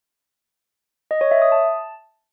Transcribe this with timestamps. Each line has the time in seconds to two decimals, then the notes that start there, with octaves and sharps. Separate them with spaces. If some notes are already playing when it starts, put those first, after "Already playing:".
1.11 D#5
1.21 C#5
1.31 E5
1.42 D#6
1.52 A5